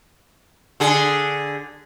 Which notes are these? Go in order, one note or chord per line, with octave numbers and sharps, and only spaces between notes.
D3 G#4